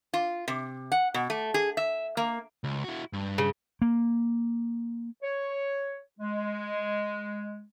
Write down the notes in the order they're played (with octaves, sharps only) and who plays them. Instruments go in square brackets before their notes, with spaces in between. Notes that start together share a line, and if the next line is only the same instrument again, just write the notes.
[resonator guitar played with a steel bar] F4
C3
F#5
B2
A3
G#4
E5
A#3
[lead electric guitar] C#2
E4 F#4
G2
[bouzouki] C#3
[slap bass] A#3
[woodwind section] C#5
G#3